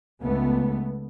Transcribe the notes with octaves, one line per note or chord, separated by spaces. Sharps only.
C#2 A3 B3